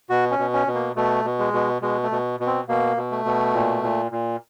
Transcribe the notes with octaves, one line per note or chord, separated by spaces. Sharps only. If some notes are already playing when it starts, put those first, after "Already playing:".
B2 F#4
C#4
B2
C#4
B2
A#3
B2 A3
B2
G#3
B2
B2 G#3
A3
B2
B2
C4
B2 A#3
B2
A3
B2
A#2
A#2
A#2